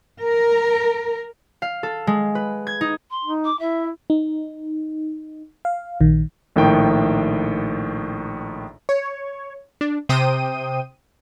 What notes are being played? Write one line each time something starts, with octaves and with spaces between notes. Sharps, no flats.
A#4
F5
A4
G#3
B4
G#6
D#4
C6
D#4
D6
E4 E5
D#4
F5
A#1 D#3
A#1 A2 D#3 G5
C#5
D4
C3 C5 G5 D#6 D#7